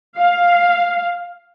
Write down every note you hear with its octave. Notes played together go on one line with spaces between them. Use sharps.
F5